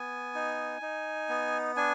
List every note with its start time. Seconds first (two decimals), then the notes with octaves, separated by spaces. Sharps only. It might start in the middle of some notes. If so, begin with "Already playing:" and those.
Already playing: B3 G#5
0.35 D#4
0.82 D#4
1.29 B3
1.77 D4 G#5